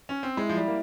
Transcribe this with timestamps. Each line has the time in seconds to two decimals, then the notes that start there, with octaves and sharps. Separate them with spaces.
0.09 C#4
0.23 C4
0.37 G#3 E4
0.49 F3
0.57 G3
0.68 A#3